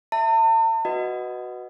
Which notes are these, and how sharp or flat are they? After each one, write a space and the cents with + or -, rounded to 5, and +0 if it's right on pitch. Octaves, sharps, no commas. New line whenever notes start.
E5 +0 A5 +45
F#4 +0 B4 +0 D#5 +0